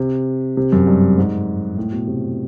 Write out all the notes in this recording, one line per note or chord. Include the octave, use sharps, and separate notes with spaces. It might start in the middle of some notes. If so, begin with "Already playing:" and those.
Already playing: C3
C3
F#2
G2
G#2
A2
B2
C3